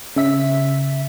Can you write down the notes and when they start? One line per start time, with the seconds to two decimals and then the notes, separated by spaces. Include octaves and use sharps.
0.16 C#3 E5 B6